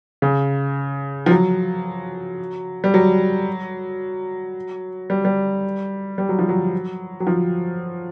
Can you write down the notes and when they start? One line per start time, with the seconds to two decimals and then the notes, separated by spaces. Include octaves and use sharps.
0.22 C#3
1.26 F3
1.30 F#3
2.84 G3
2.94 F#3
5.10 G3
5.25 G3
6.18 G3
6.29 F#3
6.39 F3
6.49 F#3
7.20 F#3
7.27 F3